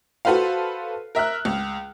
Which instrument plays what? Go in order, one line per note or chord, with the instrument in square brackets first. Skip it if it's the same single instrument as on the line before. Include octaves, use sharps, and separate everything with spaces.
[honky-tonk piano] F#4 A4 B4 C5 F5
A#4 E5 F6 F#6
C#2